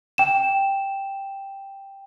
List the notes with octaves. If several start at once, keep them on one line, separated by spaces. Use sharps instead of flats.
G5 E7